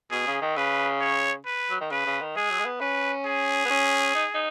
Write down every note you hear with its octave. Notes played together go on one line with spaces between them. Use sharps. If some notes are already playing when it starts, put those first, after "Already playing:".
B2 G#4
C#3
D#3
C#3 B4
C#5
B4
F#3
D#3
C#3 B4
C#3
D#3
G#3 G#4
F#3
G#3
B3
C#4 B4
G#4
B3
C#4
D#4
D#4